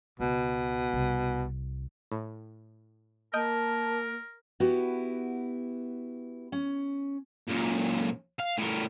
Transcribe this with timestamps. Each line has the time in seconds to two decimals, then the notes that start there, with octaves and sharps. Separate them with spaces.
0.20 C#2 B2
0.93 C2
2.12 A2
3.34 A#3 A#4 D#5 A5 G6 D7
4.60 B3 E4 F#4 G4 B4
6.52 C#4
7.48 F#2 A#2
8.39 F5
8.58 A2 A#4